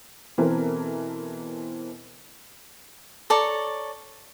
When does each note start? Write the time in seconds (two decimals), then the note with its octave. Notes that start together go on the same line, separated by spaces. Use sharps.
0.38 B2 E3 C4 A4 A#4
3.30 A4 C#5 D5 A#5